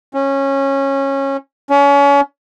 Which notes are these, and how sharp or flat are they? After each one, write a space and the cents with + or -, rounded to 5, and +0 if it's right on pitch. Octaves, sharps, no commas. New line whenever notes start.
C#4 -20
C#4 +30